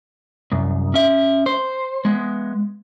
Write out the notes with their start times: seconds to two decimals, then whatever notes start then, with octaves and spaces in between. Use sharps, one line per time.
0.52 C2 F#2
0.94 C#4 E5
1.46 C5
2.05 G#3 B3